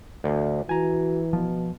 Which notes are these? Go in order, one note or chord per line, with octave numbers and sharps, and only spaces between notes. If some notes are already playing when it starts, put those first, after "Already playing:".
D2
E3 F#4 G#5 A#5
B2 F3